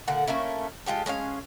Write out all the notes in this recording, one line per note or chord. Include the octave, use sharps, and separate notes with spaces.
A#2 D3 F#5
A3 A#3 C#4 E4
G#3 F4 G4 A4
G#3 C#4 G#4 F5